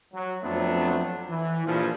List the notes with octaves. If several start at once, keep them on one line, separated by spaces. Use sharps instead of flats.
F#3
F2 F#3 A3 B3 C4 D4
E3
A#1 G2 F3